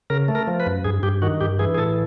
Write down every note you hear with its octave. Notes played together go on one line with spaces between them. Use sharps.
C#3 A#4
A3
A#4
F3
B4
F#2
G2 G#4
G2 G4
D#3 F#4
G2 G4
E3 G#4
G#4
A2 A4